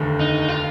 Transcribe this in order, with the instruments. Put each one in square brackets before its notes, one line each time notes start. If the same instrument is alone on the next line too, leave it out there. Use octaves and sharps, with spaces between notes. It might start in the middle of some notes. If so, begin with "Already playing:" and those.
Already playing: [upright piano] F1 D#2 D3
[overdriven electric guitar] D#4
F4